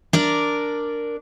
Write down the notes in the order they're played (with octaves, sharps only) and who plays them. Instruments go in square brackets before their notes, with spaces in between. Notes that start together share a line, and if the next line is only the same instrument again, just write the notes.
[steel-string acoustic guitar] D4 A#4 D5